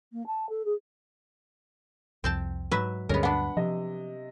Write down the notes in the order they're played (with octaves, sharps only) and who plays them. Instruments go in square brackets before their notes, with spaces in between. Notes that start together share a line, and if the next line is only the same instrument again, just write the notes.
[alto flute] A#3
A5
A4
G#4
[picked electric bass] C2 F2 [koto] C4 G5 A5
[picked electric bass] G#2 [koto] F#3 B4 E5
[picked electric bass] D2 G2 [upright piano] G#3 C#4 [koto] B3 A#4
[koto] B3 D4 [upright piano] F#5 B5
[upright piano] C3 D#5 [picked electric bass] F3